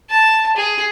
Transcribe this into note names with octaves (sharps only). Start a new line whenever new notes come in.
A5
G#4